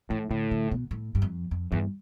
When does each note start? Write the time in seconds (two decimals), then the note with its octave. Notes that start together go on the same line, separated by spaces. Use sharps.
0.10 A2 E3
0.31 A2 D3
0.51 D3
0.72 B2
0.91 A2
1.15 G2
1.22 F2
1.51 F2
1.72 E2 G2